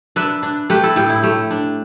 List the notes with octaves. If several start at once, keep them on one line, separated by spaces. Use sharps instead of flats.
D4 B4 E5
D4
A3 G4 B4
E4 A4
A2 G4
E4
A3 G4
D4